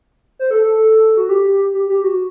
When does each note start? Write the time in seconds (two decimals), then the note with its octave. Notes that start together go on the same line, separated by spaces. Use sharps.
0.39 C5
0.51 A4
0.62 A4
0.73 A4
1.17 F#4
1.29 G4
1.74 G4
1.89 G4
2.04 F#4